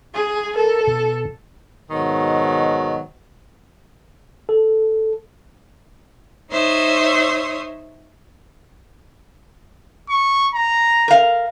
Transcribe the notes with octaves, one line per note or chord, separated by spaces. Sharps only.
G#4
A4 A#4
B2
G#2 B2 D#3 F#3
A4
D#4 C5 C#5 E5 C6 D#6
C#6
A#5
A#4 F5